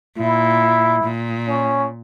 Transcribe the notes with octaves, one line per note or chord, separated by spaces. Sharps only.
A#2 E4
A#2
C#4